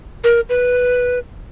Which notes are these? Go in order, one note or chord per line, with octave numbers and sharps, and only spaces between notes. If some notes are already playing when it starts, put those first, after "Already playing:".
A#4
B4